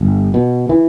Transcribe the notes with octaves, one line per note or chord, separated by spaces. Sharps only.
G1
B2
E3